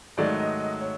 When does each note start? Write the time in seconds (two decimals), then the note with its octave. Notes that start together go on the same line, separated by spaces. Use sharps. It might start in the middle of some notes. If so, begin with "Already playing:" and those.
0.17 G#2 D#3 F#3 A3 D5
0.39 D#5
0.60 D#5
0.81 C#5